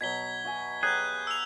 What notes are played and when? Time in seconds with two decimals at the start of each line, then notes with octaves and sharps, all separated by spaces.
0.01 B2 F#3 B3 G#6 B6 G7
0.45 F#4 E5 G#5
0.83 F#3 G4 G#4 B4 F#6 G6
1.27 E6 F7